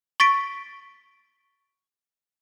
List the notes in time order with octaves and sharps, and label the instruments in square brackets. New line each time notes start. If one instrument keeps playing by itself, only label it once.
[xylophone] C#6 A6 B6 D7